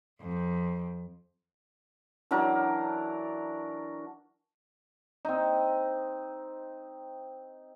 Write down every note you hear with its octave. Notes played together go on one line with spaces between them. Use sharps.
F2
E3 F#3 D4 A#4
C4 D#4